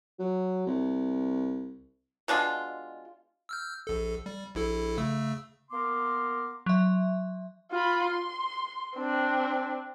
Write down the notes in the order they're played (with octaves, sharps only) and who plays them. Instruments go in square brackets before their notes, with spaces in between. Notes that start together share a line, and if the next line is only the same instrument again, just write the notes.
[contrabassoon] F#3
C2
[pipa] B2 G#3 D4 F4
[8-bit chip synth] E6 F6 G6
A#1 A4
G3
A#1 E4 A4
C#3 A3 E6
[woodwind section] A#3 B3 A#4 C6 D6
[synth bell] F#3 E5
[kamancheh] F4 B5
C6
C4 D4